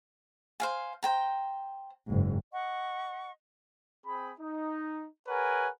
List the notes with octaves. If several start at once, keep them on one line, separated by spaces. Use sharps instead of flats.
C5 F5 G#5
C5 G5 A#5
F#1 G#2
D#5 F#5 C#6
C4 G#4 B5
D#4
G#4 A#4 B4 C#5 F#5 G#5